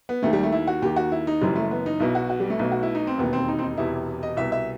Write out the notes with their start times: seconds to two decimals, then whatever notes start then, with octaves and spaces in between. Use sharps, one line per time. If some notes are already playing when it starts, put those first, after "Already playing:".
0.09 B3
0.23 D#2 D#3 A3
0.33 G3
0.43 A3
0.53 E4
0.67 F#4
0.82 D#2 D#3 G4
0.96 F#4
1.12 E4
1.27 D#4
1.41 F#1 F#2 E3 G3
1.56 A3
1.71 B3
1.86 D#4
2.00 B1 B2 E4
2.15 F#4
2.30 F#4
2.40 G3
2.50 A3
2.59 B1 B2
2.72 F#4
2.83 E4
2.95 D#4
3.07 C4
3.18 E1 D#2 D#3 B3
3.33 C4
3.48 D#4
3.59 C4
3.62 D#4
3.77 E1 E2 C3 E3 E4
4.23 D#5
4.37 C2 B2 E5
4.52 E5